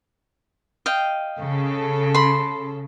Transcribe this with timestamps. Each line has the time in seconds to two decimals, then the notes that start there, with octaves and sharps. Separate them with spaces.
0.86 D#5 F5 G5
1.39 C#3 A4
2.14 B5 C6